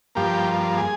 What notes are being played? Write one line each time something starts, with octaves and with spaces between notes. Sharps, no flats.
G2 F3 A#3 G4
G#4